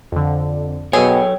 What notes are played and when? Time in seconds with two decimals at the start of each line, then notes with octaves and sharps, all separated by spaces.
0.12 F2 D3
0.93 B2 F#3 G#4 A4 C#5 G5